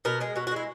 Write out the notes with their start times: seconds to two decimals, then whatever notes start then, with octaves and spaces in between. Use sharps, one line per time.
0.05 B2 A#4
0.21 G#3 G#4
0.36 B2 F#4
0.47 F#4
0.51 G#3
0.56 E4